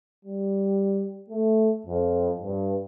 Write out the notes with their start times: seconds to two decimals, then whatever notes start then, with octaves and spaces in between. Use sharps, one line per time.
0.25 G3
1.30 A3
1.86 F2
2.41 G2